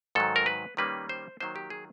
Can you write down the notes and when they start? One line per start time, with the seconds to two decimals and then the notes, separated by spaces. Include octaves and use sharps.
0.15 G#2 D#3 F#3 A4
0.36 A#4
0.46 B4
0.77 D#3 G3 A#3 C#4 B4
1.09 C5
1.40 D#3 F#3 A#3 D#4 C5
1.56 G4
1.70 G#4